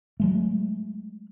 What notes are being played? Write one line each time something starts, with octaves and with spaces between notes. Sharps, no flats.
F#3 G#3 A3